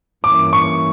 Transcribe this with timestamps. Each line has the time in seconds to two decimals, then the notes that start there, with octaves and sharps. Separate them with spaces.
0.24 G2 E3 A#3 C#4 E4 D6
0.53 C#6